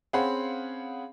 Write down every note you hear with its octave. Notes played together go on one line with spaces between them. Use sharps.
C4 C#4 G#4 F5 F#5 B5